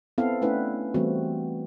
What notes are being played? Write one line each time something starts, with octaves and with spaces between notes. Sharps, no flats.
B3 C4 E4 A4 F5
A3 C#4 D4 E4 B4
E3 G3 A3 B3 C4 F#4